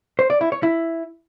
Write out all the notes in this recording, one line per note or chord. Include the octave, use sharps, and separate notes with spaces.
C5
D5
E4
C#5
E4